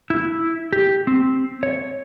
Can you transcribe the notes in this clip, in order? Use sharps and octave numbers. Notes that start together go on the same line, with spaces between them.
E4
G4
C4
C#5